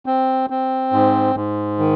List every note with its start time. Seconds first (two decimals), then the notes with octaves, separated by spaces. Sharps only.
0.06 C4
0.50 C4
0.93 G#2
1.35 G#2
1.79 D#3